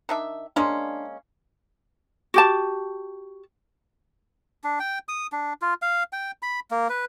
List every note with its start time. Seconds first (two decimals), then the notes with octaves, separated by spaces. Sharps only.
0.09 D#3 D4 E5
0.56 G#3 A#3 C#4 D4 C6
2.34 F#4 G4 A5
4.64 D4
4.79 G5
5.09 D#6
5.32 D4
5.62 F4
5.82 F5
6.13 G5
6.42 B5
6.71 A#3
6.89 B4